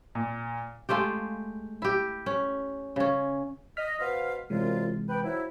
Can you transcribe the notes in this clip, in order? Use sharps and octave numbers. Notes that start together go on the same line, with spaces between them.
A#2
G#3 A3 F4 G4
E4 G4
C#4
C#3 C#4
D#5 F6 B6
B2 C5 F5
C2 F#2 C3 E3 G#3 F4
B4 G5
F3 F#3 E4